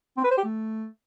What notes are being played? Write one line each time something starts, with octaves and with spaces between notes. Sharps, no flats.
C4
B4
C5
G4
A3